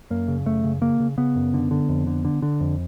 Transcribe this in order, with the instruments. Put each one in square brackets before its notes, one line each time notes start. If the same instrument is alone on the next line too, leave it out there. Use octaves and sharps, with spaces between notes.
[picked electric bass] F#2 A#3
C#3
F#2 A3
C#3
C#3 A#3
C#3
C#3 B3
F#2
D3
D3
F2
D3
D3
D3
F2